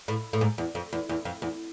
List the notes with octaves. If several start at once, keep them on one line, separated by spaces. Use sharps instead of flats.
A2
A2
G#2
E2
F2
E2
E2
F2
E2